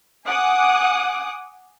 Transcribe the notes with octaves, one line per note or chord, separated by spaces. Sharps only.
F#5 G#5 D6 D#6 F#6